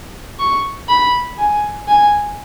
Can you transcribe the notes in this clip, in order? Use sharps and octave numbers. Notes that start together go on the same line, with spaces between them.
C#6
B5
G#5
G#5